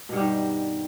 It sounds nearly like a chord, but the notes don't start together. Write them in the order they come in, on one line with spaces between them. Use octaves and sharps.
B2 G2 G3 D#3